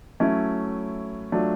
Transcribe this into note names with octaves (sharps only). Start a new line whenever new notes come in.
F#3 A3 C#4 E4
F#3 A3 D4 F4